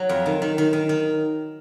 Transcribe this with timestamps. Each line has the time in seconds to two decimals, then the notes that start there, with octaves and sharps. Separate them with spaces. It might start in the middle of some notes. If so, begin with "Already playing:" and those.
Already playing: F#3
0.09 F2
0.26 D#3
0.42 D#3
0.58 D#3
0.73 D#3
0.89 D#3